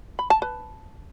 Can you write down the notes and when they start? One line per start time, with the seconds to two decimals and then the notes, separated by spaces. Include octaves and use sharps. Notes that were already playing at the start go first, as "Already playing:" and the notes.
0.19 B5
0.30 A5
0.42 B4